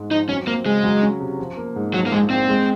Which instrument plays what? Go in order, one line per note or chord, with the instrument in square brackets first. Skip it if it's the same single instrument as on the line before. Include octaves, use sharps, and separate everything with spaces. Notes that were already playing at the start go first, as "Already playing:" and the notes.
Already playing: [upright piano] G#2 G#3
[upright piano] F3 [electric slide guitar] D#4
[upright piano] F#3 [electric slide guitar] C#4
[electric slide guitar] A#3 [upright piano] C4
[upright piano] C#3 [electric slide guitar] G#3
[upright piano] F#3
C#4
C3
F3
A#3
G#2
[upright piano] F3 [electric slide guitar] F#3
[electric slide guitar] A#3
[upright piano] A#1 [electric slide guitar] G#3
[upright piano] A#2 [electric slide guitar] C4
[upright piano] G#3